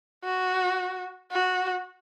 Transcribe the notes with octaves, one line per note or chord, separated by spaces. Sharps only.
F#4
F#4